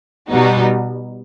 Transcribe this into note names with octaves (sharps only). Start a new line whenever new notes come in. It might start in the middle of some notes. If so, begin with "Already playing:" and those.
B2 G3 B3 D#4 F#4